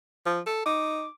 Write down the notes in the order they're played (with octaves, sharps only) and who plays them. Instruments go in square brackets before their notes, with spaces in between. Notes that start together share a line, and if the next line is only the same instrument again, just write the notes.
[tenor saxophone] F3
A4
[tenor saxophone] D#4 [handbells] D6